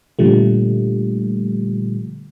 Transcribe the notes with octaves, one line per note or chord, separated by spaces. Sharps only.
A#2 D3 F3 G3 A3